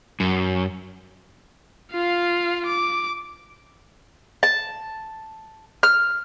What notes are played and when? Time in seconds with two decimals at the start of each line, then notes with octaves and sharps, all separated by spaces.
0.20 F#2
1.92 F4 F5
2.66 D6
4.43 A5
5.83 F6